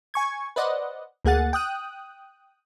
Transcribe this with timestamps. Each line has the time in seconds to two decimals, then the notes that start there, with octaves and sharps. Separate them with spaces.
0.14 G#5 C#6 G#6
0.56 B4 C5 D5 D#5 F#5
1.25 D2 A#3 G#4 F#5 A6
1.53 G5 D#6 F#6